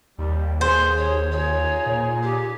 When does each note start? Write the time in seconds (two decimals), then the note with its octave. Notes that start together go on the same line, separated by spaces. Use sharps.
0.18 D#2 G3
0.61 G#4 C5
0.98 C#5
1.32 D#4 F4 G#4 C#5
1.86 A#2
2.23 G4